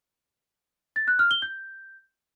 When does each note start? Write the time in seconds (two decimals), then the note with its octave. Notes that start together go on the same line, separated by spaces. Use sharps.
0.96 A6
1.08 F#6
1.19 F6
1.31 G7
1.42 G6